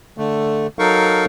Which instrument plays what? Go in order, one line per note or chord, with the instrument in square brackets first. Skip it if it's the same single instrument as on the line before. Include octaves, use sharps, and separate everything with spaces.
[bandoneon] D3 A3
F#3 D#4 A4 A#4 F5 C#6